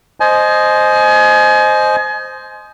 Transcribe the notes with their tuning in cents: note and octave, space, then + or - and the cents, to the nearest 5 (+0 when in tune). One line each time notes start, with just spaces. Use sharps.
C5 +0 D#5 -5 G#5 +35